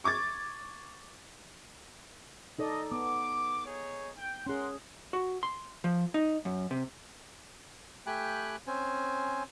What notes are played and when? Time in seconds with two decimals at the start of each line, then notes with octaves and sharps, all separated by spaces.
0.04 C#6 D6 G#6 A6
2.59 D#4 A4 D5 D#5
2.92 B3 D6
3.66 D#4 G#4 C#5
4.18 G5
4.47 C#4 G#4 A#4 F#5 C6
5.13 F#4
5.43 C6
5.84 F3
6.14 D#4
6.45 F#2
6.71 C3
8.06 A3 G4 G5 G#5 B5 F#6
8.67 C4 C#4 C5 G#5